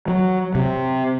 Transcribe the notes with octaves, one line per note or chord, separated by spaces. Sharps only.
F#3
C3